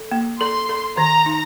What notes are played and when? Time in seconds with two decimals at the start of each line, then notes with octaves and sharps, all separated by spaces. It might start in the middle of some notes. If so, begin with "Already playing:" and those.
Already playing: A4
0.11 A#3
0.40 A4 C6
0.69 A4
0.97 D#3 A#5
1.26 D#4